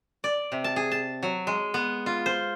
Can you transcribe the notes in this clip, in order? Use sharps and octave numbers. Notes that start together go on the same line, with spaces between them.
D5
C3
A5
G#4
A5
F#3
G#3
B3
F4
C5